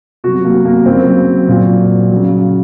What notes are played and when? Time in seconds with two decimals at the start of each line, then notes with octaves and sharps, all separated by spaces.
0.24 C3 F#4
0.28 F#3
0.45 A#3
0.65 A#3
0.86 C#3 F#3 C4
1.48 A#2 F#3
2.11 C#3 F#3